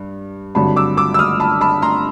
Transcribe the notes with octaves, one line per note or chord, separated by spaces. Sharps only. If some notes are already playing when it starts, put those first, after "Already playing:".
Already playing: G2
G#1 G2 D3 F#3 A5 B5
D6 E6
D6 E6
E6
D#6 F6
A5 B5
A5 B5
A#5 C6